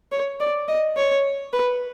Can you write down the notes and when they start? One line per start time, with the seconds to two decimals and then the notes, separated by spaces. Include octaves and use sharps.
0.12 C#5
0.40 D5
0.68 D#5
0.97 C#5
1.53 B4